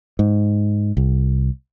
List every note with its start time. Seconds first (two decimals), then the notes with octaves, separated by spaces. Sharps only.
0.19 G#2
0.97 C2